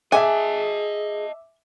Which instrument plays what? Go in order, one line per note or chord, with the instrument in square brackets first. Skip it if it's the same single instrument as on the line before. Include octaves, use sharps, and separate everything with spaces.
[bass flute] G#4 [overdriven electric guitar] D#5 A5 [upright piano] E5 D6 [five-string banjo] G#5